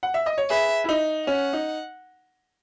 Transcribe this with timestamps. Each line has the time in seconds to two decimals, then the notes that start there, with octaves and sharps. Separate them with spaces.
0.03 F#5
0.14 E5
0.26 D#5
0.38 C#5
0.50 G#4 B4 E5
0.84 E4
0.89 D#4
1.27 C#4 F#5
1.53 D#4